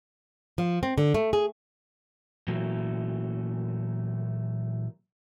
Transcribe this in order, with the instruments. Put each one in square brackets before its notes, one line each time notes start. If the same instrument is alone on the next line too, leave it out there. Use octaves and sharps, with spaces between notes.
[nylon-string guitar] F3
C4
D3
A3
G#4
[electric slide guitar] A#2 E3 F#3 A3 A#3